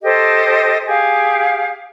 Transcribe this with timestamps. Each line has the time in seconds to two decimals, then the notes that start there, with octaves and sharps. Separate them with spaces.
0.03 G4 A4 C5 D#5
0.86 G4 G#4 F5